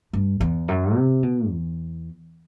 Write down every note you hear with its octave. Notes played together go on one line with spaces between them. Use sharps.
G2
E2
F#2
C3
B2
E2